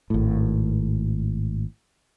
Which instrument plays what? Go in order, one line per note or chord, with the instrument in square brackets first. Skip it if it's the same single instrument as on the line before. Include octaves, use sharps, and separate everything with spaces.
[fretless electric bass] G#1 A2